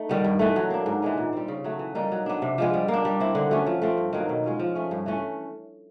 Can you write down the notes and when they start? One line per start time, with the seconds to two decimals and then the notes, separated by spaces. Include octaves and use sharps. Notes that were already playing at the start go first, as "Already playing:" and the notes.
Already playing: A3 D#4
0.09 D#3 G3 B3
0.24 G2
0.39 E3 A3
0.56 F#3
0.70 A#3 D4
0.86 G#2
1.02 E3 G#3 B3
1.17 A#2
1.33 G3 C4
1.48 C#3
1.64 F#3 A3
1.79 E3
1.95 G3 A#3 D#4
2.12 F#3
2.26 B3 D4
2.42 C3
2.58 F3 G#3 B3
2.74 G3
2.88 A#3
2.94 D4
3.05 G3
3.20 C4 E4
3.35 D3
3.51 F#3 A3 C#4
3.66 F3
3.82 A3 C4 F4
3.97 G2
4.13 D#3 F#3 A#3
4.29 B2
4.44 G#3 C#4 F4
4.59 F3
4.75 A3 C#4
4.91 G2
5.06 E3 A3 C#4